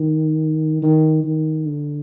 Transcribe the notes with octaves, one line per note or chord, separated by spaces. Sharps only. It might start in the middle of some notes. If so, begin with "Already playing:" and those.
Already playing: D#3
D#3
D#3
D3